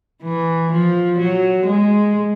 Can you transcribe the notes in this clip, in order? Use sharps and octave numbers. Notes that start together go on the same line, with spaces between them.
E3
F3
F#3
G#3